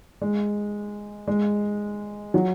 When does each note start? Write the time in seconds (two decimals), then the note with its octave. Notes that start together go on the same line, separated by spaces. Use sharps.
0.22 G#3
1.28 G#3
2.34 F#3